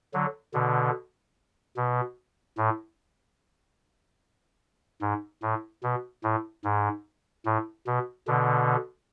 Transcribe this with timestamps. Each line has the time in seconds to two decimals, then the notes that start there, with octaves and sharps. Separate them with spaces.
0.14 D3 F#3
0.54 B2 D3
1.76 B2
2.57 A2
5.01 G#2
5.42 A2
5.83 B2
6.24 A2
6.64 G#2
7.45 A2
7.87 B2
8.27 B2 D3